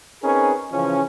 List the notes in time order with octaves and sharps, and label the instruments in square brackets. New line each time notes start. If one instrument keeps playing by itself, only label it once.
[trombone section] C4 C#4 D#4 G#4 A#4 B4
C#3 E3 F3 C#4